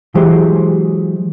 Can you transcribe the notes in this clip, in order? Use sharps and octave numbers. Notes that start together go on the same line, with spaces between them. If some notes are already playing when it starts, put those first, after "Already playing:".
E3 F#3 G#3 G4 C5